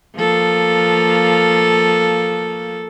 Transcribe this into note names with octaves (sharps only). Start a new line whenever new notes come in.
F3 A#3 A4